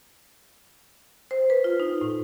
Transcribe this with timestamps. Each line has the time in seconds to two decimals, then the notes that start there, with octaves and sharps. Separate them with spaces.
1.31 C5
1.50 B4
1.64 F4
1.80 D#4
2.01 A2